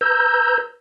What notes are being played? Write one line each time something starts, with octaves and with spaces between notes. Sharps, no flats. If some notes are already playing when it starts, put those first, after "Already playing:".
B4 A#5 E6 G6